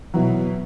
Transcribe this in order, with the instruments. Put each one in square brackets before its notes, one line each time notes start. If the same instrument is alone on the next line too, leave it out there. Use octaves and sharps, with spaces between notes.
[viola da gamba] B2 [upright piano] F#3 B3 E4